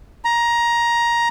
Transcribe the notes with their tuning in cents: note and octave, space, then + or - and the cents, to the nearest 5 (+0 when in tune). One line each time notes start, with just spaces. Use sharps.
A#5 +15